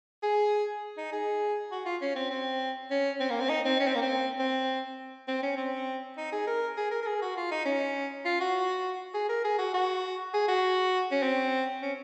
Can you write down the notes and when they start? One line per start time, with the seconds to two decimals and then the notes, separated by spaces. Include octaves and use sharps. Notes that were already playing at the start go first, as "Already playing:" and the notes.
0.23 G#4
0.97 D#4
1.12 G#4
1.71 F#4
1.86 F4
2.01 C#4
2.16 C4
2.30 C4
2.91 C#4
3.20 C4
3.30 A#3
3.40 C4
3.49 D#4
3.65 C4
3.80 C#4
3.87 C4
3.95 A#3
4.02 C4
4.39 C4
5.28 C4
5.43 C#4
5.57 C4
6.17 D#4
6.32 G#4
6.47 A#4
6.77 G#4
6.91 A#4
7.02 A#4
7.07 G#4
7.22 F#4
7.36 F4
7.51 D#4
7.65 C#4
8.25 F4
8.40 F#4
9.14 G#4
9.29 A#4
9.45 G#4
9.59 F#4
9.74 F#4
10.34 G#4
10.48 F#4
11.11 C#4
11.23 C4
11.82 C#4